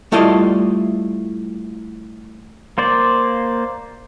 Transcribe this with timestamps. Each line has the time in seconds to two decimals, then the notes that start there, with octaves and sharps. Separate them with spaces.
0.12 G3 A3 E4 F4 D5 D#5
2.78 A#3 C5 D5